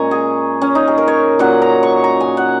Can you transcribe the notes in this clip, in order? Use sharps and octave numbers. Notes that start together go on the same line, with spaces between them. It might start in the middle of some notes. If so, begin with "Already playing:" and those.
Already playing: A#2 G#3 C#4 G#5 A#5 C#6
G#4
C#4
D#4
G#4
A#4
C#5
A#2 F#3 C#4 F#5
A#5
C#6
A#5
G#5
F#5